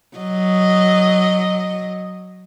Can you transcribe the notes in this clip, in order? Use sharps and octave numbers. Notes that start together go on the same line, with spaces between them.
F#3 D#5